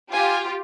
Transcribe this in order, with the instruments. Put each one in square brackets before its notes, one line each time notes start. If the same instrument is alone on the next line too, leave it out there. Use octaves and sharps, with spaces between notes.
[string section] F4 G4 [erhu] G#5